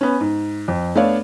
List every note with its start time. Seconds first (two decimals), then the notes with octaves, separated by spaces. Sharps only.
0.01 B3 C#4
0.20 G#2
0.68 F2
0.95 A3 B3 D4 C#5 D5 F5